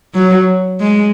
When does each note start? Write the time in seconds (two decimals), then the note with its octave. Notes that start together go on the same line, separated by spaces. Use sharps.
0.15 F#3
0.81 G#3